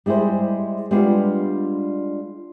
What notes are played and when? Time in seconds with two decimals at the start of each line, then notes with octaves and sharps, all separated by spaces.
0.06 G3 G#3 E4 G#4 C5
0.91 G3 G#3 B3 D4 F4